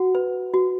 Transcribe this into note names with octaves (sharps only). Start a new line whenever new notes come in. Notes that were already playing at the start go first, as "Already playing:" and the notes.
Already playing: F#4 F#5
B4
F#4